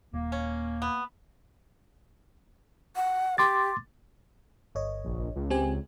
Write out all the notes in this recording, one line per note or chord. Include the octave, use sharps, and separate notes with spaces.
D#1 A#3
C#4
B3
F#5
G4 C6 D6 A6
G1 C#5 D#5
A#1
C#2
C4 G4 G#5